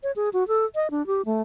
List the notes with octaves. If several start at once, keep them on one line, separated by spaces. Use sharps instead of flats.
C#5
G#4
F#4
A4
D#5
D4
G4
A3